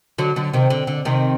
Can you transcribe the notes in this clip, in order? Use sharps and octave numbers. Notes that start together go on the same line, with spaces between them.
D3 F#3
D3 F#3
C3 D#3
D3
D3
C3 D#3